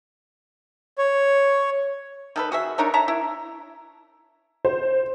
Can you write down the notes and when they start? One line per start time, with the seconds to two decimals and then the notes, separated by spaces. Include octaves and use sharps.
0.98 C#5
2.36 D#3 A4 B4
2.52 F#4 G#4 E5
2.78 D4 D#4 A#4 C#5
2.94 C#5 E5 A5 A#5
3.08 E4
4.65 C5